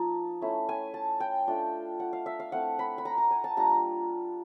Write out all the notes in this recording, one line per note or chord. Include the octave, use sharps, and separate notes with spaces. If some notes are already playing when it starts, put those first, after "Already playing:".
Already playing: F3 A#3 D#4 A5
A3 C#4 E4
G#5
A5
G5
A3 D4 F4
F#5
F5
E5
F5
A3 C4 E4 F#5
B5
B5
A#5
A#5
G#5
A5
G3 A#3 D4 F4 A#5